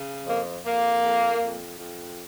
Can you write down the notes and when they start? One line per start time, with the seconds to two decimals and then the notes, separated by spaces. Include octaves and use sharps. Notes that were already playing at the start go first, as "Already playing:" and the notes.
Already playing: C#3
0.26 F2 A#3
0.64 F2 A#3
1.03 F2
1.41 F2
1.78 F2